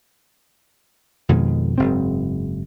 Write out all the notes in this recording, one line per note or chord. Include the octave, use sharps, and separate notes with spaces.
F2 B2 D#3 G#3
F#1 G#2 C4